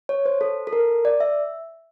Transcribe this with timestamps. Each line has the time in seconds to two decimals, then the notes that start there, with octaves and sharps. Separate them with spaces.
0.09 C#5
0.26 C5
0.41 A4
0.67 A4
0.73 A#4
1.05 D5
1.20 E5